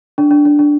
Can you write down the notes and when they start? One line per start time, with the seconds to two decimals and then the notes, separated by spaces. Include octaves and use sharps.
0.18 D4
0.31 D4
0.45 D4
0.59 D4